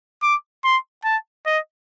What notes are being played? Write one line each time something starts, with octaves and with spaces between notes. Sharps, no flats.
D6
C6
A5
D#5